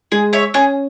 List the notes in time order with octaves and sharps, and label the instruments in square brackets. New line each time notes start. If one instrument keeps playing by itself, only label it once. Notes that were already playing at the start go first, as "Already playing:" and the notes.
[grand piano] G#3 [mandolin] G#4
[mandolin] C#5 E5
[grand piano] C#4 [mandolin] G#4